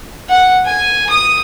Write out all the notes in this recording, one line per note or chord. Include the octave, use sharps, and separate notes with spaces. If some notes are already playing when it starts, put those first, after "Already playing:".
F#5
G#5
D#6